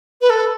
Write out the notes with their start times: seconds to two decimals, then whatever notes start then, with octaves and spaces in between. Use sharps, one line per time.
0.21 B4
0.30 A4